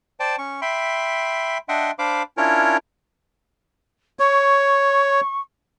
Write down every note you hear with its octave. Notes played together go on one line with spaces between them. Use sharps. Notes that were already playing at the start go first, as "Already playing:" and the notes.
C5 D5 G5 A5
C#4 C#6
E5 G5 B5 C6
D4 D#5 E5 F#5 G5 C6
D4 C5 F5 B5 D6
C#4 D4 E4 F4 A#4 C#5
C#5 C#6